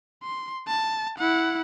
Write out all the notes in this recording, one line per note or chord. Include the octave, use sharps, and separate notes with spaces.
C6
A5
E4 F#5